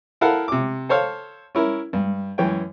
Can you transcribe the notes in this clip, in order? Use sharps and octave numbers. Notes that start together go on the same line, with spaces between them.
E4 A4 A#4 F5 F#5
C3 D6
A4 C5 C#5 F5
C#4 E4 A#4
G2
F#2 E3 C#4 G5